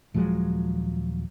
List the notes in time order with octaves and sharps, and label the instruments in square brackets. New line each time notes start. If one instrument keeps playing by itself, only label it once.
[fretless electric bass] D#1 F3 F#3 G#3